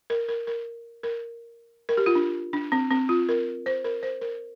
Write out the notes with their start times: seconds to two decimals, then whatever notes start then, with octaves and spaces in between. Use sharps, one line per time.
0.10 A#4
0.28 A#4
0.47 A#4
1.03 A#4
1.89 A#4
1.97 G4
2.06 F4
2.15 D4
2.53 D4
2.72 C4
2.91 C4
3.09 F4
3.29 A#4
3.66 C5
3.84 A#4
4.03 C5
4.21 A#4